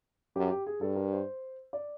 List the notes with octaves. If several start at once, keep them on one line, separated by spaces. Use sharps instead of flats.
F#2 G4
G4
G#4
G2 A4
A#4
C5
D5